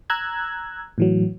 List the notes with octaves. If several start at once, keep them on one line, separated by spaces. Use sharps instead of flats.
A#5 E6 F#6 G#6
A2 E3 F#3